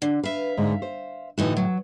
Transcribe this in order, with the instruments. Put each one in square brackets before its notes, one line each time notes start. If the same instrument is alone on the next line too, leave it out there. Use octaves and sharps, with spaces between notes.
[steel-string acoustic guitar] D3
[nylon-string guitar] B4 [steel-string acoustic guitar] E5 F5
[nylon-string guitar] G#2 D3 G#3
C5
[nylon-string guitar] A2 D3 A3 [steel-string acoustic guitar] E3 D#4 F#4
[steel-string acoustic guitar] F#3